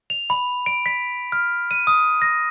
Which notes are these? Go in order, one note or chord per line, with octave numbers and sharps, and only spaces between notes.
F7
B5
D7
B6
F6
D#7
D#6
A#6